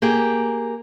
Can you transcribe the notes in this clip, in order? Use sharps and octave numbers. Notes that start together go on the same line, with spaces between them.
A#3 G4 G#4